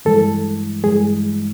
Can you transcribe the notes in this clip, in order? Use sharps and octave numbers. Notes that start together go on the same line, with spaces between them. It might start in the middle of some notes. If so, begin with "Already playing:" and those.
G2 E3 G#3 A4
G2 E3 G#3 G#4